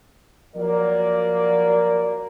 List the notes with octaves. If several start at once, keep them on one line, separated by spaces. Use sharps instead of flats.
F3 F#3 A#3 A#4 D5